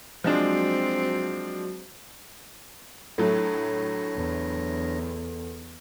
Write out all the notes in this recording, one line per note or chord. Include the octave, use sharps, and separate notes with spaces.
F3 F#3 G#3 C4 D4 F#4
A2 F#3 A3 D4 A4 C#5 A#6
E2